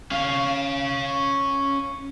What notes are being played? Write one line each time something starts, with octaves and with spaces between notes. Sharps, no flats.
C#4 F5